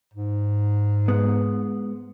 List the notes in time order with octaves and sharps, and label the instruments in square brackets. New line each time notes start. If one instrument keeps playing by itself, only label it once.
[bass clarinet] G#2
[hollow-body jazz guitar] G#3 B3